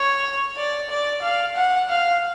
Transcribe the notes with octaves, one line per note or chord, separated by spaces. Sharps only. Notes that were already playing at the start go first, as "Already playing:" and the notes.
Already playing: C#5
D5
D5
F5
F#5
F5